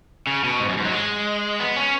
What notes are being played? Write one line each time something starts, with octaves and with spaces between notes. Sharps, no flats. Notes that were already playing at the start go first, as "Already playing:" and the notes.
C#3
B2
G#2
F#2
G#2
F#3
G#3
B3
C#4